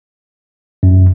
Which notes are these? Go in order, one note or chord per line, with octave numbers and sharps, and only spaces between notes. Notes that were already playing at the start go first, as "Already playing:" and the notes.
F#2